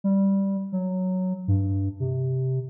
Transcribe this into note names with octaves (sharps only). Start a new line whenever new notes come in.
G3
F#3
G2
C3